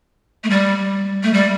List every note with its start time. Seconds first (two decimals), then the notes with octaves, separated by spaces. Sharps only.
0.44 A3
0.50 G3
1.23 A3
1.33 G3